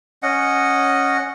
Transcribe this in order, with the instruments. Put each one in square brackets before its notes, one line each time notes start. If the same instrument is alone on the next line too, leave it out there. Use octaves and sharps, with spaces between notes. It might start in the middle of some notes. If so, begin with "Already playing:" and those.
[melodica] C#4 D#5 F#5